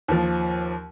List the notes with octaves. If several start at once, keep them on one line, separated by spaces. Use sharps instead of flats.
D#2 F3